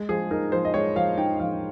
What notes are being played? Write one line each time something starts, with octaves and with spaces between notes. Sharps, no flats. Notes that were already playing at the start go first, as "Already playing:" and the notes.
Already playing: G#3
F3 G#4
D#4 A#4
F3 C5
D#5
G#3 C#5
F3 F5
D#4 G5
F3 F5